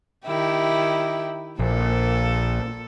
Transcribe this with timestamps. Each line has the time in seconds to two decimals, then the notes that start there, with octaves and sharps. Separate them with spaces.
0.26 D#3 E4 G4
1.59 A#1 A#2 A4